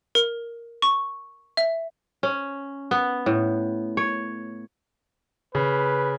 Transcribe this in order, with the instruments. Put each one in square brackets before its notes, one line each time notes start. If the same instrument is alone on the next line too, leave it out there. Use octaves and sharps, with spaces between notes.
[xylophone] A#4
C#6
E5
[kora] C#4
B3
A2
C#5
[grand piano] C#3 [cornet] B4